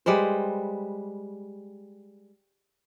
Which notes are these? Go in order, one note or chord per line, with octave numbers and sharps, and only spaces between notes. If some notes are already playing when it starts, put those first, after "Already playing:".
G3 G#3 B4 C5